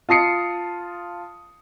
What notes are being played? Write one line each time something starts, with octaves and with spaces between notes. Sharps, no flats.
F4 A5 D#6 C7 C#7